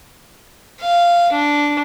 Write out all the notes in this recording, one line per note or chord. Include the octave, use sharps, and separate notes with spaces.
F5
D4